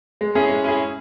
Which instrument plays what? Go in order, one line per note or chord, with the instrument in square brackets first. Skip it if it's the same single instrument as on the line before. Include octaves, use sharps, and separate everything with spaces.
[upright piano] G#3
C#4 E4 G#4
G#3
C#4 E4 G#4